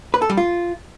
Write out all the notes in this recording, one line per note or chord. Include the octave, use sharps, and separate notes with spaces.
B4
A4
G3
F4